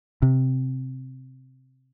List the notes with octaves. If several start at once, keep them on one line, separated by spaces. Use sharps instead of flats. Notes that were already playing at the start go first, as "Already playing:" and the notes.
C3